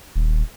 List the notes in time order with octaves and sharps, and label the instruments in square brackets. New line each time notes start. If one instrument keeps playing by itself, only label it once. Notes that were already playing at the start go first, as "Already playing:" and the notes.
[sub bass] D#1